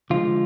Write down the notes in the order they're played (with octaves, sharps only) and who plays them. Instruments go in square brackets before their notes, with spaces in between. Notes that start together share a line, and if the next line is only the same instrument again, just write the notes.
[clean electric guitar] D3 F3 G#3 F4